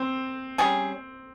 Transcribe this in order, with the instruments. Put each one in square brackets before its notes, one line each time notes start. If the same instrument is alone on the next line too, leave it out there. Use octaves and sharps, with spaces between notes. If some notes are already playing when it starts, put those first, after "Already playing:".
Already playing: [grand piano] C4
[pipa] G3 C#4 G#4